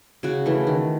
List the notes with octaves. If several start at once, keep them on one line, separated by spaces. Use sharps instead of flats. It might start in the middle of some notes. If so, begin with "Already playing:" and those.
C#3 F#4
E3 A3
D#3